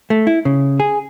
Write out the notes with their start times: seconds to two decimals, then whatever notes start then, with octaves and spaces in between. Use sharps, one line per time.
0.10 A3
0.27 E4
0.45 C#3
0.80 G#4